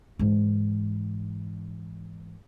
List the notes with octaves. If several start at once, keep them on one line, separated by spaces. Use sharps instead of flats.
G#2 E3